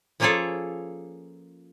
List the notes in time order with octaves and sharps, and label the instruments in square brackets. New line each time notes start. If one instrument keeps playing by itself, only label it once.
[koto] F3 A#3 C#4 F4 G#4 A4